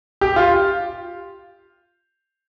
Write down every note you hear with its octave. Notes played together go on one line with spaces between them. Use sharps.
G4
F4